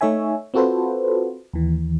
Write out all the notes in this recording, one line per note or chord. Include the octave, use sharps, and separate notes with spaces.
A3 D#4 C#5 E5 G#5
C4 F4 F#4 A4 B4 C5
D#2 E3